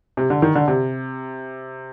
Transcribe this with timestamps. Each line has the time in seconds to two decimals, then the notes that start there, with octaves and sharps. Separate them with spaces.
0.17 C3
0.30 D3
0.42 D#3
0.55 D3
0.68 C3